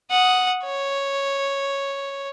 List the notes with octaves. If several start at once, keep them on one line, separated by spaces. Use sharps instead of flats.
F#5 D#6
C#5